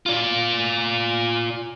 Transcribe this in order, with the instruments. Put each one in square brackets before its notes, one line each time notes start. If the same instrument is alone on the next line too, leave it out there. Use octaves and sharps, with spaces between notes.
[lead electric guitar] F4 D5